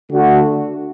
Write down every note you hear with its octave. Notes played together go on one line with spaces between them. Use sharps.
D3 A3 F#4